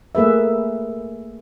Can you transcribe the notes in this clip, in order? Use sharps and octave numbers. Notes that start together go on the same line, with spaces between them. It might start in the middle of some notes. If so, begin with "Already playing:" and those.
A3 A#3 G#4 B4 E5